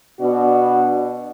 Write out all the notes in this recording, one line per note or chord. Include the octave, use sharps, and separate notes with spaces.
B2 B3 D4 F#4